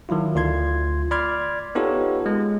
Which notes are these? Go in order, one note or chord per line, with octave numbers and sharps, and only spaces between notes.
D#3 F#3 E4 F4
D2 F4 C6 G#6
D5 B5 C6 D6 F6 G#6
B3 D#4 F4 G4 A4 C#5
G#3